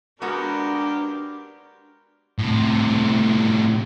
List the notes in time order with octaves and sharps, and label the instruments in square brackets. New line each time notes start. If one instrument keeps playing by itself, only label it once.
[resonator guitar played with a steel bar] G#3 B3 F#4 [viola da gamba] D4 [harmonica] G4 A#4
[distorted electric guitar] A2 C3